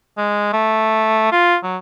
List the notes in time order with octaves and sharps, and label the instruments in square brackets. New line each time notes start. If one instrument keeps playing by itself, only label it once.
[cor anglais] G#3
A3
F4
F#3